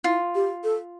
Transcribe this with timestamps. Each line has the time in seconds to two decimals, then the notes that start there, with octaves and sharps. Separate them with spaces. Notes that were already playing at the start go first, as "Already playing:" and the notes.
0.04 E4 F4
0.35 G4
0.64 A4